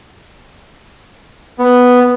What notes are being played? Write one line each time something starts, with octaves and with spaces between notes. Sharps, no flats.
B3